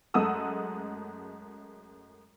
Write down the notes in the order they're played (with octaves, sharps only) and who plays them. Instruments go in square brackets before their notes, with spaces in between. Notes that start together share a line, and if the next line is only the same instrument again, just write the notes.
[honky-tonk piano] F#2 G#3 A3 F#5 D#6 E6